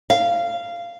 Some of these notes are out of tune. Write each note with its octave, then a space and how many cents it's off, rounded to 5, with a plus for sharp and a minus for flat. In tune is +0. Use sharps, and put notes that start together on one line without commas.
F5 -15